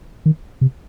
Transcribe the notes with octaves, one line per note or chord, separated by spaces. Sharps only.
D#3
C3